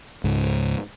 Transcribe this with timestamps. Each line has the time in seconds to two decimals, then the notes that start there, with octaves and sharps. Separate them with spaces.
0.24 C#2 G#2